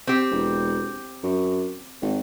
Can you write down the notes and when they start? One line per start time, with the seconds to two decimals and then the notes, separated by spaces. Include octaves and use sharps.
0.07 C4 G4
0.31 E1
1.23 F#2
2.02 G#1